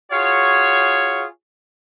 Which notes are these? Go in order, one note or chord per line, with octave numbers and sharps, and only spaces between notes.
F4 F#4 G#4 C#5